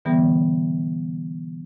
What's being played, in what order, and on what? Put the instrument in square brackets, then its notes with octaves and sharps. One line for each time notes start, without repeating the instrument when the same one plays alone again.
[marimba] B2 D3 E3 G3 B3 G#4